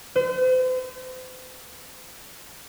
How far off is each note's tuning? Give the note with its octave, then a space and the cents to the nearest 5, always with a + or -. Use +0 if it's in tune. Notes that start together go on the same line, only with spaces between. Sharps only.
C5 -40